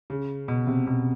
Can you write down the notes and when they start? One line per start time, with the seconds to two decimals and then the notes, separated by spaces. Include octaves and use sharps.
0.10 C#3
0.48 B2
0.67 C3
0.87 B2